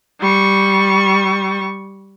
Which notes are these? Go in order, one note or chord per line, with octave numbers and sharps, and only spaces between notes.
G3 C#6